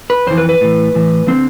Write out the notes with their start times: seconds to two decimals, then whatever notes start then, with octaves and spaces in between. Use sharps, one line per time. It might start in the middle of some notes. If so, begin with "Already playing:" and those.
0.10 B4
0.27 F2 E3 C5
0.38 B4
0.49 B4
0.61 A2 E3
0.94 A2 E3
1.27 D3 F3 C4